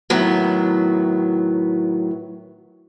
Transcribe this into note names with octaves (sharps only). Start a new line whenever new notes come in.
A2 D#3 F#3 B3